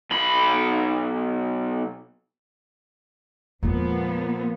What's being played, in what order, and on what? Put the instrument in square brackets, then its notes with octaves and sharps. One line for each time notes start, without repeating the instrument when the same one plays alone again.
[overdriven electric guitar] B1 B5
[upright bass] E2 G#3 [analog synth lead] A#2 [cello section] F3 A#3 B3